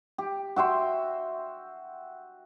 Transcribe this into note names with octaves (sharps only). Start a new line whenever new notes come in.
G4
F#4 E5 G5 C6